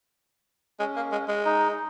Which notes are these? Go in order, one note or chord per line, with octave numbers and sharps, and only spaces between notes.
G#3 C#4
A#3
G#3
G#3
D#4